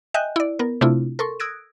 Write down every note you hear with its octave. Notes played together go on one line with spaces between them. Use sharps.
D#5 E5 G5 G#5 F#6 G6
E4 D5
B3 A#4
C3 A3 C4 D4 E4 F4
A4 A#4 C6 C#6
D#6 E6 F#6 G#6 A#6 D7